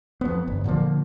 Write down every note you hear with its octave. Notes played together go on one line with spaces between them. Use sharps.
F2 B3
G1
A#2 D3 F3 A#3